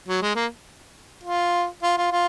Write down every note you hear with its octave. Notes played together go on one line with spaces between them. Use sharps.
F#3
G#3
A#3
F4
F4
F4
F4